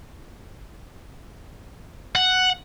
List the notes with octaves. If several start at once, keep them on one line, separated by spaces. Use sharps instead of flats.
F#5